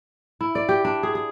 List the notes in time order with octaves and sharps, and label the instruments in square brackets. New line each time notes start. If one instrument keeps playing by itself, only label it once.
[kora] E4
D5
G4
D4
G#4
G#4